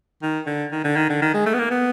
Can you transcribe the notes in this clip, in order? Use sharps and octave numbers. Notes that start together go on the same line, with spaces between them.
D#3
D3
D#3
D3
D#3
D3
D#3
G#3
A3
B3
A#3
B3